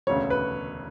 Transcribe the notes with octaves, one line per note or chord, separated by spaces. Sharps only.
E1 D2 C#3 C#5
B4